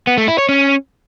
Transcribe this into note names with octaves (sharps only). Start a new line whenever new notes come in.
B3
A3
E4
C#5
C#4